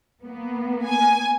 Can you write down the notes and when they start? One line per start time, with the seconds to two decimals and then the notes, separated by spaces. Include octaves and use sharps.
0.23 A#3 B3
0.87 G#5